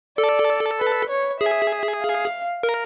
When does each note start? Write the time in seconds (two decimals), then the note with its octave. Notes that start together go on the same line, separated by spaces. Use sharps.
0.18 A4 D5
0.79 B4
1.10 C#5
1.40 G#4 E5
2.02 F5
2.63 A#4